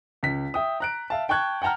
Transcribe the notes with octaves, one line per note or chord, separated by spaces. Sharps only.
C#2 B6
E5 G5 D#6
A#5 F#6 D7
E5 F5 A5
G5 A5 C#6 F#6 G#6
F#5 G5 A5 A#5 F6